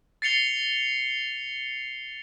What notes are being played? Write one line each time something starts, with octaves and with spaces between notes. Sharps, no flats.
A6 C7 C#7 F7 G7